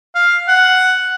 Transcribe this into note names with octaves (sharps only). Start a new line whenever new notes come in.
F5
F#5